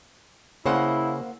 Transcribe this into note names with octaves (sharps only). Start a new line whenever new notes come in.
C#3 A#3 E4 C5 F#5